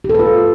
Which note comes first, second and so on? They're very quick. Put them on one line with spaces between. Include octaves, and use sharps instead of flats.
G4 A4 B4 F4